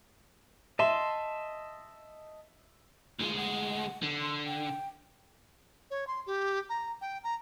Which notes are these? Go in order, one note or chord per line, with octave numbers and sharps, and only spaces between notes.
D#5 E5 A5 C6
D2 G#3 F4
F#5
D3
C6
G5
C#5
C6
G4
A#5
G5
A#5